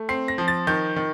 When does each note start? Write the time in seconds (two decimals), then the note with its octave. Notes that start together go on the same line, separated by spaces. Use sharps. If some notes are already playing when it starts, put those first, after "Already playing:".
Already playing: A3
0.09 C4 C7
0.28 A#6
0.38 F3
0.48 A6
0.67 D#3 G6
0.96 D#3